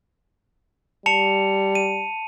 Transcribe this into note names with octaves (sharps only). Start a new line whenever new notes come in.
G3 A5 C#7 F7
D#7